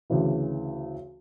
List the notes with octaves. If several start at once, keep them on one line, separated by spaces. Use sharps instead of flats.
D2 C#3 E3